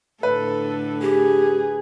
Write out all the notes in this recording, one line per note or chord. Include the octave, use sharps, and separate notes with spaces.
A2 D3 A4 B4
G4 G#4